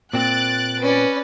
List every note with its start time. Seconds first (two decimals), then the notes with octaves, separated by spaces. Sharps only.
0.13 A#2 C4 F#6 A6 D7
0.82 C#4 B4 D5